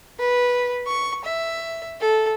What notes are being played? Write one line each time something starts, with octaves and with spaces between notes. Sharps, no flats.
B4
C#6
E5
A4